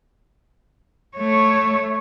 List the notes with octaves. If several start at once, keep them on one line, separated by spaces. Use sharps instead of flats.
A3 C#5